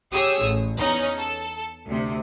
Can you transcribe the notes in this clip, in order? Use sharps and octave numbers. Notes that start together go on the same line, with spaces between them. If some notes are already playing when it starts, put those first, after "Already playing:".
G4 G#4 C#5 D#6 E6
A1
E2 C#4 D#4
A4
D2 C3